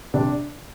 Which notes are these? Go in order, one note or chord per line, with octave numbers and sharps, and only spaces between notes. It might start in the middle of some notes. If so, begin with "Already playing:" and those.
C3 D4